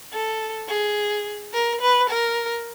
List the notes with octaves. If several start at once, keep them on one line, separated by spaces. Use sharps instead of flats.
A4
G#4
A#4
B4
A#4